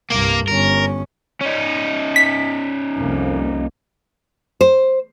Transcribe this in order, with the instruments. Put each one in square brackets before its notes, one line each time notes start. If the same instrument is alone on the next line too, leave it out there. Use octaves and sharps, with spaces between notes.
[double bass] C2 G2 [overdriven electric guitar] A#3 A#4
[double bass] G1 C#4 [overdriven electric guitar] A#4
[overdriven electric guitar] C#4 D#4
[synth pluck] B6
[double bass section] C2 F2 A#3
[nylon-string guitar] C5